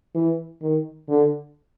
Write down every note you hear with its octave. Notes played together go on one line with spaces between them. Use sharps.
E3
D#3
D3